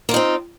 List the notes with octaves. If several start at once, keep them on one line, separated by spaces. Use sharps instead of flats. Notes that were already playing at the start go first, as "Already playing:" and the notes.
A#3 C4 D#4 F4